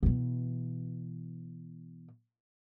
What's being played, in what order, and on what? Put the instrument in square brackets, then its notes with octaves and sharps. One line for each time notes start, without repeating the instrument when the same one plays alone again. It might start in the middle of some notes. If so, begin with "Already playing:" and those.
[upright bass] B2 E3